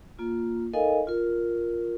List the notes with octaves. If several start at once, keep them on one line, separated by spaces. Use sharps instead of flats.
A#3 F4
D#4 A4 A#4 D#5 F5 G#5
F4 A#4